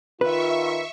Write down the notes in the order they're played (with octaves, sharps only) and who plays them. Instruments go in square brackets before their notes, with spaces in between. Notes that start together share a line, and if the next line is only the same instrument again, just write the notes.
[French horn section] D#3 F4 [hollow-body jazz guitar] B4 [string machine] E5 C#6